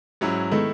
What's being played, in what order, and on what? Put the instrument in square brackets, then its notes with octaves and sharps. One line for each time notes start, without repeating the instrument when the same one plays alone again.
[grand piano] G#2 F#3 C#4 E4
[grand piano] D#3 A3 E4 [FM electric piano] G#3 B3